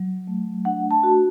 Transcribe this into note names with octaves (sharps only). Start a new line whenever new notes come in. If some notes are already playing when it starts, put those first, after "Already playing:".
Already playing: F#3
A3
D4 F#5
A5
F#4